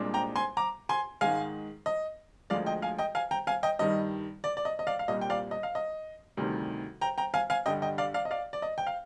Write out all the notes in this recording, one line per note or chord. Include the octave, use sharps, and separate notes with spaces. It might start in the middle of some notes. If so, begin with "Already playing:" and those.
Already playing: C2 A#2 G#3 D4
G5 A#5
G#5 C6
A#5 D6
G#5 C6
G#2 D#3 G#3 F5 G#5
D#5
D2 D3 F3 G#3 D5 F5
D#5 G5
F5 G#5
D#5 G5
F5 G#5
G5 A#5
F5 G#5
D#5 G5
G2 D#3 G3 D#5
D5
D5
D#5
D#5
D5 F5
F5
C2 A#2 G3 D#5
G5
D5 F5
D#5
F5
D#5
D2 C3 D#3 G3
G5 A#5
G5 A#5
F5 G#5
F5 G#5
G2 D3 G3 D#5 G5
D#5 G5
D5 F5
D5 F5
D#5
D5 F5
D5
D#5
G5
F5